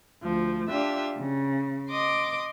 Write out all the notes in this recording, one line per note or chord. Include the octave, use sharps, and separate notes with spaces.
D2 F3
D4 F4 G4 E5
C#3
D#5 C6 D6 D#6